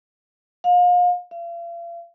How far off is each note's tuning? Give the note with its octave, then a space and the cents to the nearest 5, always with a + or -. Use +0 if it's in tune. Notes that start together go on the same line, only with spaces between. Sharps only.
F5 +35
F5 -40